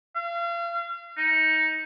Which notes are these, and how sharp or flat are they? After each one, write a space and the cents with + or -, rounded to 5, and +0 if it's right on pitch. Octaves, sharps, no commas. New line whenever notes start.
F5 -35
D#4 +15